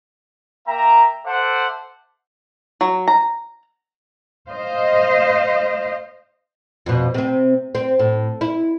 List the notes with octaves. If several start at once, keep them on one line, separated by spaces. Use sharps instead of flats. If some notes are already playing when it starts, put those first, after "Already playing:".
A#3 E5 G5 A#5
A4 C5 E5 F#5 A5 D6
F#3
A#5
C5 D#5 F5
F2 B2
C3 C4
C4
A2
E4